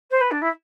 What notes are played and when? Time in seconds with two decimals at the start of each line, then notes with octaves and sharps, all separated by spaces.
0.10 C5
0.20 B4
0.31 D4
0.41 E4